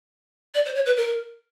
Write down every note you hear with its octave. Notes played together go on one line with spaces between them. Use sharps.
D5
C5
C#5
B4
A#4